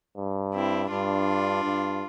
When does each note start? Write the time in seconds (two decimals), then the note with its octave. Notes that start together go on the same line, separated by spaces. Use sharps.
0.17 G2
0.53 C4 E4
0.90 G2 D4 F4
1.64 G2